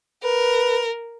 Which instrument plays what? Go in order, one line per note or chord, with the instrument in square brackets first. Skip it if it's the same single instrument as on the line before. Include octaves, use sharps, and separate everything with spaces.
[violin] A#4 [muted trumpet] B4